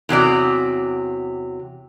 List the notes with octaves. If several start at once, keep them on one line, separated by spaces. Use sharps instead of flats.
E2 C3 F#3 D5